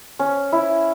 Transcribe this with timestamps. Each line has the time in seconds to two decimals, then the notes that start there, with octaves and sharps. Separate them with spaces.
0.19 C#4
0.52 E4